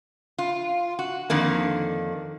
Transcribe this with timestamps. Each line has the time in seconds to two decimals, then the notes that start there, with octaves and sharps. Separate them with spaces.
0.38 F4
0.99 F#4
1.30 F2 D3 D#3 A#3